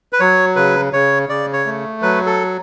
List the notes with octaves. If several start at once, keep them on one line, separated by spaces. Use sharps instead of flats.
B4
F#3 C#5
C#3 B4
C#3 C#5
C#3 D5
C#5
A3
F#3 B4
A4